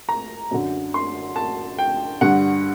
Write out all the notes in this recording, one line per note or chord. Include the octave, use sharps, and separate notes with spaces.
A#5
F#2 D3
C6
A5
G5
G2 D3 F#5